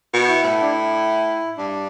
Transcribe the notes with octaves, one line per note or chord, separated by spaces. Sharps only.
B2
E4
A2
D4
E4
G2 D4